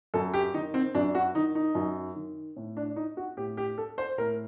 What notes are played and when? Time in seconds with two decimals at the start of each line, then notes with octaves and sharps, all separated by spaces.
0.14 F#2 A4
0.33 G4
0.54 D#3 D#4
0.74 C4
0.95 F#2 D4
1.15 F#4
1.35 D#3 D#4
1.55 D#4
1.75 F#2
2.16 D#3
2.56 A2
2.77 D4
2.96 D#4
3.17 F#4
3.37 A2 G4
3.57 G4
3.78 A4
3.98 C5
4.18 A2 A#4